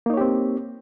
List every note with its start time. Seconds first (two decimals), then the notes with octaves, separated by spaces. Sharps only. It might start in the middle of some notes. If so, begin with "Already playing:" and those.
0.06 A#3
0.10 D#4
0.14 C#5
0.17 G4
0.21 C4